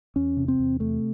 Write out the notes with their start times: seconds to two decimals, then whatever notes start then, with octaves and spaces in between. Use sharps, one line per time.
0.16 E2 C#4
0.37 C3
0.48 C4
0.60 E2
0.80 C3 A3